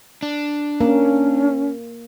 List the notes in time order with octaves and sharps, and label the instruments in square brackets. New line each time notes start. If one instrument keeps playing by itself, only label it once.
[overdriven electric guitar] D4
[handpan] A#3 [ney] C#4